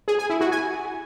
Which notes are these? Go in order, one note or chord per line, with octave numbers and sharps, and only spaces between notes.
G#4
G#5
E4
F#4
G#5